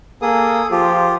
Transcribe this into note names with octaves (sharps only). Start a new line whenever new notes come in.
A#3 G#4 A4 D#6
F3 F4 G4